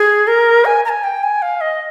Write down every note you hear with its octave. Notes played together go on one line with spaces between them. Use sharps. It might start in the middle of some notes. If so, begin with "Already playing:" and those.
Already playing: G#4
A#4
G#5
A#5
G#5
G5
G#5
F5
D#5